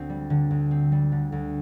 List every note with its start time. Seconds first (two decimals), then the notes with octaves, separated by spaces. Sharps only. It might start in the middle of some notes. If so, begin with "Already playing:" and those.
Already playing: D2 C4
0.10 G3
0.30 D3
0.51 D2
0.71 C4
0.92 G3
1.12 D3
1.32 D2